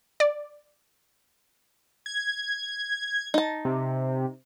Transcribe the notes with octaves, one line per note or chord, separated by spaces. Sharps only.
D5
G#6
D#4 A5
C3